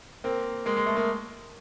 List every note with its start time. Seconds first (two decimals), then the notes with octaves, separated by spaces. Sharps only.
0.24 A#3 C4
0.66 G#3 A#3
0.77 G#3
0.87 A3
0.96 G#3 A#3